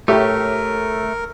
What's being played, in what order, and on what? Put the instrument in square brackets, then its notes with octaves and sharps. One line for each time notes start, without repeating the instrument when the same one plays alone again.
[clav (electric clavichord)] A2 C#5 [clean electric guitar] A3 [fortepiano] G4 [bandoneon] A#4